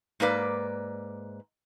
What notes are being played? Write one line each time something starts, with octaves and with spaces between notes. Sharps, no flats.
G#2 A#3 B4 D5